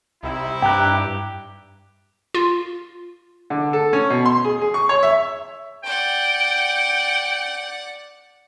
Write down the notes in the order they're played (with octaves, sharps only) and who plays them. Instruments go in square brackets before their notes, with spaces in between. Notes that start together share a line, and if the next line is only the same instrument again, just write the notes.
[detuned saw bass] C2 [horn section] C4 D#4 E4
[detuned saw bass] G2 [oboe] G4 [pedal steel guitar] G5 A#5 F#6
[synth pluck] F4
[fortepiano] D3
A4
C#4
B2
C6
G#4
G#4
C#6
C#5
E5
[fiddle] D5 F#5 [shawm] G5